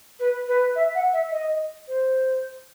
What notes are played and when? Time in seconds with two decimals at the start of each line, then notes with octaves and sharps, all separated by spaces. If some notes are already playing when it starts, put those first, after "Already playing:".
0.20 B4
0.48 B4
0.76 E5
0.95 F#5
1.13 E5
1.31 D#5
1.88 C5